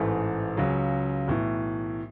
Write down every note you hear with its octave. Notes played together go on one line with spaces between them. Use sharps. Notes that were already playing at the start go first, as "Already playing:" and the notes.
Already playing: A1 G#2 E3 A3
C#2 C#3 F#3
B1 A2 E3